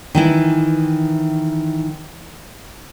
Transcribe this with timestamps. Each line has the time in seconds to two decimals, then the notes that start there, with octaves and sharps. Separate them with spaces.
0.15 D#3 E3 E4